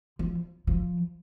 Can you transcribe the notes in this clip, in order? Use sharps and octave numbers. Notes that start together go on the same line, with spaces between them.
F3
F3